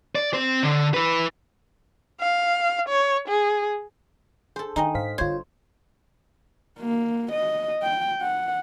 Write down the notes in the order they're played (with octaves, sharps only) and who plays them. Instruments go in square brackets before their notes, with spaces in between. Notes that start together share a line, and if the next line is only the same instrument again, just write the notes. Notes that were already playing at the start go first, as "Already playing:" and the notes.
[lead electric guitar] D5
C4 C5
D3
E4 B4
[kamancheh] F5
C#5
G#4
[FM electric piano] G#4 [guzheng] A4 C5
[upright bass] D#3 [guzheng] D#4 D#5 [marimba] G5 G#5 A#5
[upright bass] G#2 [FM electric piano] C5 F5 B6
[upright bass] G1 D3 [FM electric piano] F4 C#5 [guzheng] C5 [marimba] G#6
[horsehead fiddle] A#3
D#5
G5
F#5